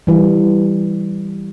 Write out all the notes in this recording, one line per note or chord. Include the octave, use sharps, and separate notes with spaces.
E3 G3